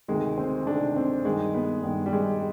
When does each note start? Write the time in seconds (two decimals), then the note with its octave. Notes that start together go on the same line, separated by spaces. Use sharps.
0.08 D2 C3 D#3 G#3
0.38 C4
0.67 D2 C3 D#3 D4
0.96 C4
1.25 G2 D#3 G#3
1.54 B3
1.83 G2 D#3 B3
2.06 G3
2.13 G#3